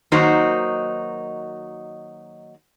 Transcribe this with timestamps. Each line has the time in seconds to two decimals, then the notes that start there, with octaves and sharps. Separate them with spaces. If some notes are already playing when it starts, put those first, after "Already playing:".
0.12 D#3 F#3 A#3 D#4 F#4 C5